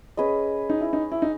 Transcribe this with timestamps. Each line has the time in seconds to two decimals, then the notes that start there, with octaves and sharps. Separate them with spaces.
0.17 C#4 G#4 B4 D#5
0.70 D#4
0.81 E4
0.93 D#4
1.12 E4
1.22 D#4